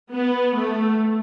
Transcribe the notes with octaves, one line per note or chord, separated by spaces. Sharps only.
B3
A3